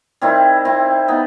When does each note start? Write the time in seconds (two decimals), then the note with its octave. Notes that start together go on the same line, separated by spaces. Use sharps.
0.21 D#3 G3 C4 E4
0.65 C4 E4
1.08 B3 D#4